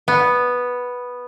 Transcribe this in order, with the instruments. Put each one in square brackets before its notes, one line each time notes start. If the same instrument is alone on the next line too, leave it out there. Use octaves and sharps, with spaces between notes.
[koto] B3